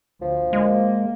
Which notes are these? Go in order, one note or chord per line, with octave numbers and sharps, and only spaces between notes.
D2 F3
G#3 A#3